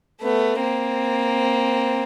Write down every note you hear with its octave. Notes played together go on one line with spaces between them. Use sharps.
A3 B3
A#3 C4